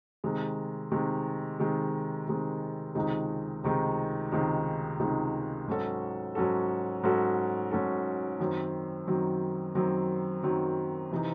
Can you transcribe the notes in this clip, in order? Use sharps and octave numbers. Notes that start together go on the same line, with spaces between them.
C3 D#3 G#3
C3 D#3 G#3
C3 D#3 G#3
C3 D#3 G#3
C#2 C3 D#3 G#3 D#4
C#2 C3 D#3 G#3 D#4
C#2 C3 D#3 G#3 D#4
C#2 C3 D#3 G#3 D#4
G#2 F#3 C#4 F#4 A4
G#2 F#3 C#4 F#4 A4
G#2 F#3 C#4 F#4 A4
G#2 F#3 C#4 F#4 A4
F#2 D#3 F#3 C4
F#2 D#3 F#3 C4
F#2 D#3 F#3 C4
F#2 D#3 F#3 C4
C3 E3 C4 D#4